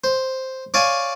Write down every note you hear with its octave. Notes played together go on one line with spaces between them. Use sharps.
C5
C#5 D5 F5 G#5